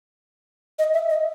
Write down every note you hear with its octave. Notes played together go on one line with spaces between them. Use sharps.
D#5
E5
D#5